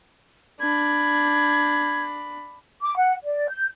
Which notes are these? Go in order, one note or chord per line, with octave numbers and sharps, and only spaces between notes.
D4 B5 G#6
D6
F#5
D5
G6